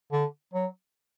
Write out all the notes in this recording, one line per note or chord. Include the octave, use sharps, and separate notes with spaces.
D3
F#3